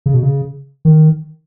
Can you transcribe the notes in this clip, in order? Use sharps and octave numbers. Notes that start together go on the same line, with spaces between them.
C#3
B2
C#3
D#3